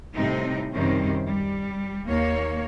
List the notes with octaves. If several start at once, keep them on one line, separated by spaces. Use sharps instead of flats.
A2 C3 G3 C4 D#4
F#2 C3 D#3 G3 C#4 C5
G3
D#2 A#3 C#5